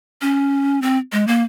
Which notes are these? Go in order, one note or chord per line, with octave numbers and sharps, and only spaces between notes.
C#4
C4
G#3
A#3